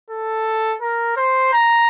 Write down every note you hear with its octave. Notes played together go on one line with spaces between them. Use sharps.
A4
A#4
C5
A#5